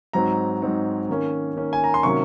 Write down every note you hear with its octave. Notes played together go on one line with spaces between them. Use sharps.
G#2 F#3 C4 D#4 A#5
G#2 F#3 C4 D#4
D#3 A#3 C#4
D#3 A#3 C#4
G#5
A#5
C6
C3 D#3 F#3 A#3 C#4 C#6